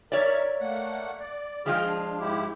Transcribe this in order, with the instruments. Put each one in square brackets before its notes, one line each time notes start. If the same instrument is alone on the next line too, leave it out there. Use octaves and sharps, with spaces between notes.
[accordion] A#4 E5 [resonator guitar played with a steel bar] C#5 D5
[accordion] A3 A#3 F#5
D5
[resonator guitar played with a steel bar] F3 G#3 F4 [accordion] G#4 G5 F6
[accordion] D4
G#2 E4 G4